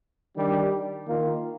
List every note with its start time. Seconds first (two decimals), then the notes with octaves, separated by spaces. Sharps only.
0.37 D#3 G3 D4 G4
1.06 D#3 A#3 F4